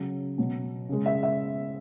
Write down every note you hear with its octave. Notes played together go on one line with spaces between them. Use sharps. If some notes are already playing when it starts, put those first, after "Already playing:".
Already playing: C#3 F#3
B2 F#3
C#3 G#3
E5
E5